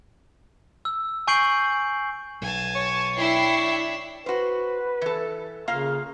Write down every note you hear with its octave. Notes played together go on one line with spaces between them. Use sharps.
E6
G#5 C#6 G6 C7 D7 F#7
B1 G#5 A5
C#5
D4 E4 E5 G5 C7
F#4 B4 C5
E3 A4
C#3 A#3 F4 F5